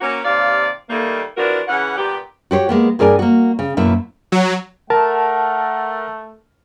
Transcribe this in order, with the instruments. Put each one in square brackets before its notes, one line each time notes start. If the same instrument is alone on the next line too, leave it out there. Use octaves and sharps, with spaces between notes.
[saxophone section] A#3 C#4 F#4
D#2 C3 D5 F5
D#3 G3 A3 A#3
E3 F3 D4 F4 F#4 A#4
C#3 E3 C#4 F#5
G2 A#2 B3 G4
[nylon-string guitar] F#4 G4 C5 C#5
G#3 A#3 B3
G2 G#4 A#4 D5 G#5
A#3 F#4
C#3
F#2 B2 F#3 A#3 E4
[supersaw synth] F#3
[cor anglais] A3 [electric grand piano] A#4 [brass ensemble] F#5 [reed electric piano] A5